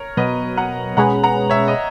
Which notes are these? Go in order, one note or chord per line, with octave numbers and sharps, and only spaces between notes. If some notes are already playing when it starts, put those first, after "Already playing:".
Already playing: A#4 C#5
B2 F#3 B3 B4 D#5
F#5 A#5
B2 G#3 C#4 G#4 B4 F#5 A#5
F#5 A#5
C#5 E5
D#5